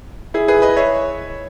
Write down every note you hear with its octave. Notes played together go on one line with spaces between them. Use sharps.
E4 G#4
G#4 B4
B4 D#5
C#5 E5